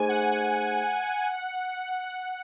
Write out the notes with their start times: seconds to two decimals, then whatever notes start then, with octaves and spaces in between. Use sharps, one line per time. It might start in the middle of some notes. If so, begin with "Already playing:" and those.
Already playing: A3 D#4 G#4 C5 D#5 G#5
0.09 F#5
2.04 F#5